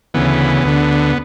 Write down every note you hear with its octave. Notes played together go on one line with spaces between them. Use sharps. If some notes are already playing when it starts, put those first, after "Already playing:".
D2 C#3 E3 B3
D2 D3